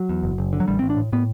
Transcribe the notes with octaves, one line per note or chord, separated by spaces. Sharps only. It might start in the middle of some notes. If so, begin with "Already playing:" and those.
Already playing: F#3
E2
F#1
F#1
D3
F#3
A1 G3
A1 C4
D4
A2
A2 B3